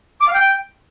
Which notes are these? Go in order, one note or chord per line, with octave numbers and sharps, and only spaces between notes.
D6
F5
G5